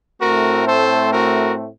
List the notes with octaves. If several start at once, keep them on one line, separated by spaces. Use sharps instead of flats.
A2 A3 C4 F#4 A#4
A4 C5
F#4 A#4